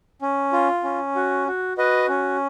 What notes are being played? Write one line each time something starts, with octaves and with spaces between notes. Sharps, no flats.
C#4
F4
C#4
F#4
F#4
F#4 B4 D#5
C#4